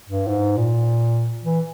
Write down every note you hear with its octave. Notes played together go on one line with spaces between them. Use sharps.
G2
G#2
A#2
E3